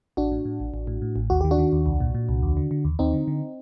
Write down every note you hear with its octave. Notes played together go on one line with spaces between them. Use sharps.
A1 D4 F#4
A2
A2
A1
A1
A2
A2
A1
D#2 F#4
D#3 G4
D4 F#4
D#3
D#2
C2
A#2
A#2
C2
D#2
D3
D3
D#2
D#2 C4 D#4
D3
D3